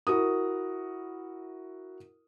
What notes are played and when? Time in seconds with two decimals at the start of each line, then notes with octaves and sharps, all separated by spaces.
0.07 E4 F#4 A#4 D#6